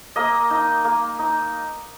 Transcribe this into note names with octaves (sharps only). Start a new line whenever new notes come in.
A#3 D#5
D#4
A#3
D#4